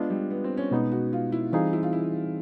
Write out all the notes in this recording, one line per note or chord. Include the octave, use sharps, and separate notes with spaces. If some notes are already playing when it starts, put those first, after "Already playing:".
Already playing: G#3 B3 D4 F4
G3
B3
C4
C#4
B2 G#3 B3 D#4
F#4
F4
E4
E3 G3 C4 D#4 F4 G#4
E4
F4
E4